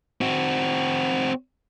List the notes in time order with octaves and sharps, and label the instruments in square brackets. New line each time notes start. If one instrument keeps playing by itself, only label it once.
[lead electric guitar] C4 F#4